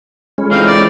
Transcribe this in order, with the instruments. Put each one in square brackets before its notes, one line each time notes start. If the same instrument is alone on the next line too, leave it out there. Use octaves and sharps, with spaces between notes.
[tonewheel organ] G#3 C#4 [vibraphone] F4 A4 B5
[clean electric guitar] E3 C4 D#4 [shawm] F5
[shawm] D5